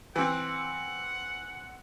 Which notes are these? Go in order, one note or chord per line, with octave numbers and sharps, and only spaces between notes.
E3 C4 F#5